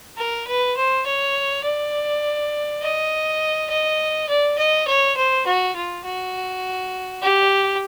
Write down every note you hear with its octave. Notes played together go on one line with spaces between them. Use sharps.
A#4
B4
C5
C#5
D5
D#5
D#5
D5
D#5
C#5
C5
F#4
F4
F#4
G4